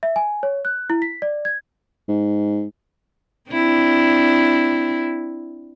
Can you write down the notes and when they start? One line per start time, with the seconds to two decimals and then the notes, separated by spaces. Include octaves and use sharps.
0.03 E5
0.16 G#5
0.43 C#5
0.65 F#6
0.90 E4
1.02 B6
1.22 D5
1.45 G#6
2.08 G#2
3.51 C4 D4 E4